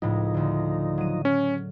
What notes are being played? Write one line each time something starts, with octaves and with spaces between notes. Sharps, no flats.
C#2 A2 F3 D#4
D2 D3
F#3 D#7
C#4